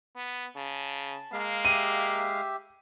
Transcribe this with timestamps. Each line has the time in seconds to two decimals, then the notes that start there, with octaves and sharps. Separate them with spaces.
0.16 B3
0.56 C#3 A5
1.33 G#3 A#3 F5
1.65 G4 E5 D#7